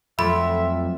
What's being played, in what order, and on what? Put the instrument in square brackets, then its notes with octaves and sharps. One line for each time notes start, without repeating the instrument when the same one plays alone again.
[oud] F2 [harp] F3 F#3 A3 [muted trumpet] E5 [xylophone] B5